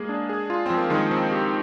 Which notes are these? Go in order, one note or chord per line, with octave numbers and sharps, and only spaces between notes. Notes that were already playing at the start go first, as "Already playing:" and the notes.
Already playing: G#3 A#3 G#4
D4
G#4
F4
F3 C4
A#3
D#3 G#3
C4
G4